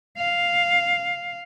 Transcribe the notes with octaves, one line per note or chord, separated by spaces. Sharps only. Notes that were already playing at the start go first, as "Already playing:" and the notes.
F5